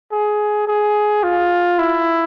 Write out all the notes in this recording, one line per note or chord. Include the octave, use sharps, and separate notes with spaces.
G#4
G#4
F4
E4